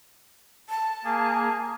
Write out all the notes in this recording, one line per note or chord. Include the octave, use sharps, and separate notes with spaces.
A5
A#3 G#4